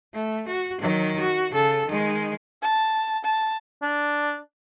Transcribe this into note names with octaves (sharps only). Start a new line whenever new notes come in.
A3
F#4
D#3 F#3
F#4
C#3 A4
D#3 G#3
A5
A5
D4